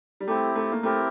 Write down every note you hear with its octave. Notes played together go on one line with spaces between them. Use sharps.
G3
A3 C4 E4 G4
A3
A#3
A3 C4 E4 G4 A#4